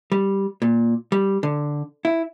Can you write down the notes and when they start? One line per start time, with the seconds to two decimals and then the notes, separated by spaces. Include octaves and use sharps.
0.12 G3
0.62 A#2
1.12 G3
1.43 D3
2.05 E4